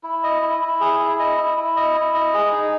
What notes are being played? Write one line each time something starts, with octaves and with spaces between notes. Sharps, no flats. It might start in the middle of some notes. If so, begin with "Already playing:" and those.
E4
D#5
E4
E4
G#4
E4
D#5
E4
E4
D#5
E4
D#5
G#4
D#4